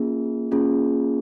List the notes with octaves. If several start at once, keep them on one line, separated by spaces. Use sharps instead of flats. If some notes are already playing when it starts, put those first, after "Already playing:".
Already playing: A#3 C#4 F4 G#4
A#3 C#4 F4 G#4